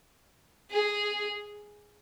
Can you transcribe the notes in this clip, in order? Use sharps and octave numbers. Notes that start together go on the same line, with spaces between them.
G#4